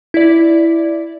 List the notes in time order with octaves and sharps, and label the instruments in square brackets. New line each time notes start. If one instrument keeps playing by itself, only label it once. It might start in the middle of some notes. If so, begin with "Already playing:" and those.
[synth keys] E4 D5